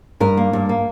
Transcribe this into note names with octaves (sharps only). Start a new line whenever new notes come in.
G2 A#4
A#3
G2
A#3